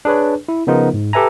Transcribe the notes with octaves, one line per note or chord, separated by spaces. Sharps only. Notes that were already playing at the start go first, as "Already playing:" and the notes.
D4 G#4 B4 C#5
E4
C#3 F3 B3 D#4 F4 A#4
G#2
G4 A4 B4 E5 G#5 A#5